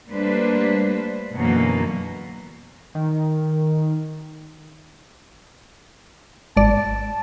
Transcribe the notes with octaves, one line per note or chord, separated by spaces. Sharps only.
G3 A3 A#3 D4 B4 C5
F#2 B2 D3 E3 F#3 A#3
D#3
G#1 D5 A5